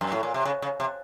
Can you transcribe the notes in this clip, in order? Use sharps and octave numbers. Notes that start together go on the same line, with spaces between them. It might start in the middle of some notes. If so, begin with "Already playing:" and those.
F#2
A2
A#2
C3
C#3
C#3
C3